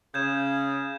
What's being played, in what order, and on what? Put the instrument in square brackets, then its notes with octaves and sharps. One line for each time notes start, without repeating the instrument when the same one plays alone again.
[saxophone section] C#3 [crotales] G6 G#6 E7